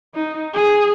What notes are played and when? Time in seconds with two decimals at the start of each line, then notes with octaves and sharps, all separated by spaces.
0.15 D#4
0.54 G#4